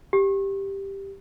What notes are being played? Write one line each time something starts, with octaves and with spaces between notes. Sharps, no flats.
G4